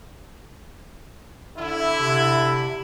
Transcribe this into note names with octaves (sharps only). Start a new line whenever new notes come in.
D3 E4
C3